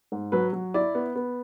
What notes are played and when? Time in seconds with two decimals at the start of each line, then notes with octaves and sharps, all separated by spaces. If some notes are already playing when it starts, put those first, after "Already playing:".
0.12 G#2
0.32 F#3 B4
0.53 F#3
0.74 E4 D5
0.95 B3
1.16 B3